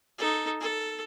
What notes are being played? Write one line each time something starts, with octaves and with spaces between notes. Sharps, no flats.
D#4 A4
A4